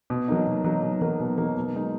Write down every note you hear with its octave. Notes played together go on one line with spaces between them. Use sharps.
B2
F#3 A#3 D#4
B2
F#3 A#3 D#4
B2
F#3 A#3 D#4
B2
F#3 A#3 D#4
B2
G#3 D#4